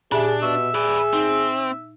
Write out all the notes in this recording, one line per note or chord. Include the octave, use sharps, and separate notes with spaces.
A#2 D4 G4 G#4 E5
B2 E5 C#6
G#4 B4 D5
C4 D#4